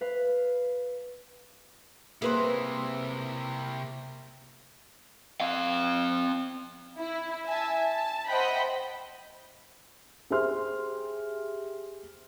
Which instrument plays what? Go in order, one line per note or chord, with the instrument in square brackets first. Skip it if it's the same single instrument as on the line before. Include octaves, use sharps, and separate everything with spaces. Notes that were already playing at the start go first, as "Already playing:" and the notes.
[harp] B4 F5
[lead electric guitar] C3 E4 [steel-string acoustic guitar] A#3 [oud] G#4 B4 C5
[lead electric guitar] C4 F5
[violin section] E4
E5 G#5 A5
A5
C5 D#5 E5 F#5 G5 B5
[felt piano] G4 G#4 C5 E5 C6 F6